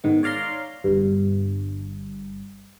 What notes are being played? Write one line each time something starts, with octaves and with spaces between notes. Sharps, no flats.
G#2 D#3 B3
C#5 D5 F5 A#5 C6
G1 G2